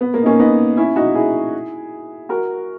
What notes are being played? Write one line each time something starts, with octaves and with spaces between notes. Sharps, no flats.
B3
A#3
D#4
A#3 C#4
B3 D#4
C#4 E4
D#4 F#4
E4 G#4
F#4 A#4